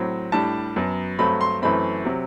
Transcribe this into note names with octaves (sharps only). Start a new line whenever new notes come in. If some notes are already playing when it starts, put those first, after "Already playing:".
Already playing: A2 F#3 C4
A2 G3 D4 A5
F#2 F#3 B3
G2 F#3 A3 C4 B5
C6
F#2 E3 A3 C4 B5
C3 F#3